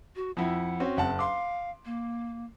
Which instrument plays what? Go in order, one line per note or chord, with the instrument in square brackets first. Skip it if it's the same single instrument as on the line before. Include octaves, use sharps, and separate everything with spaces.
[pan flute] F#4
[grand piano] F2 E4 [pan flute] F#5
[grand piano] C4 C#4 F#4
[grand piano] F#1 F#5 A5 [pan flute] C4
[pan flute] F5 [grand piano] C6 D6
[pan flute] A#3